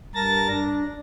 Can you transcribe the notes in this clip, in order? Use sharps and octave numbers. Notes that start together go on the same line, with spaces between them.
G2 A#4 A5 A6 A#6
D4